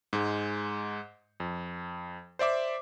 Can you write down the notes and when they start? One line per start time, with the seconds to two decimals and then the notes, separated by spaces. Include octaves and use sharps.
0.13 G#2 G#3
1.40 F2
2.39 C5 D5 E5 D6